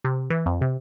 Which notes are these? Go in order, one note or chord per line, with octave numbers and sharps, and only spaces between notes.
C3
E3
F2
C3